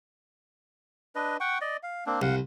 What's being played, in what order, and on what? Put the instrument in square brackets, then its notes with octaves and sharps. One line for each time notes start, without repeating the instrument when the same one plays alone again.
[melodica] D4 B4 D#5
F#5 G5 C#6
D5 D#5
F5
A#3 C4 D4
[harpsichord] C2 [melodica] F5 F#5